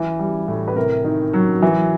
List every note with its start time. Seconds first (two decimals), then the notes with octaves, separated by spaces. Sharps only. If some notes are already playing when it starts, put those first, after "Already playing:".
Already playing: E3
0.19 G3
0.48 A2
0.68 B4
0.76 C3 A#4
1.04 D#3
1.33 F#3
1.62 E3